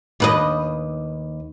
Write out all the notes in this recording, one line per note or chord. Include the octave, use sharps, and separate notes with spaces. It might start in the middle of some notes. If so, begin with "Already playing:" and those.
D#2 B4 D#5